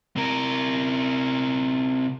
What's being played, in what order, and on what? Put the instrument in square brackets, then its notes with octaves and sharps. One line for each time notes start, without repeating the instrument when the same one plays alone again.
[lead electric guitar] C3 A#4